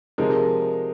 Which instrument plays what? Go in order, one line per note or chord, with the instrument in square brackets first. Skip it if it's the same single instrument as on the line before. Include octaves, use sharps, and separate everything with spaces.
[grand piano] C3 F3 G#3 D#4 [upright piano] A#4